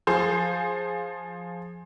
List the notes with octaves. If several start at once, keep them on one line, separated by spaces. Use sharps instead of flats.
F3 G#4 C5 G6